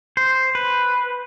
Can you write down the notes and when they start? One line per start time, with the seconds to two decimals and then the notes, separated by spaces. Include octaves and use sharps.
0.17 C5
0.55 B4